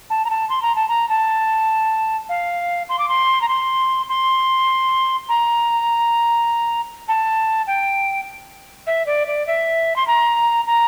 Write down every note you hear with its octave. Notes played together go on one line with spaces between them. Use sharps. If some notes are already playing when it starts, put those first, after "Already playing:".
A5
A#5
A5
C6
A#5
A5
A#5
A5
F5
C6
D6
C6
A#5
C6
C6
A#5
A5
G5
E5
D5
D5
E5
C6
A#5
A#5